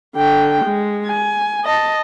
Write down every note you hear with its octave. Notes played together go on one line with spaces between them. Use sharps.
D3 G5
G#3
G#5
D#5 A5